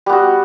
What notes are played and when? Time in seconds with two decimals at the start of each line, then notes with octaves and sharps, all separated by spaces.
0.06 G3
0.09 B3
0.12 F#4